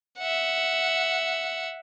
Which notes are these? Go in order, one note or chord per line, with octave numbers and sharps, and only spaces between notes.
E5 F#5